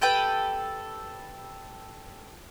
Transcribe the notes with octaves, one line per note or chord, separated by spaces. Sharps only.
G4 A4 B4 G5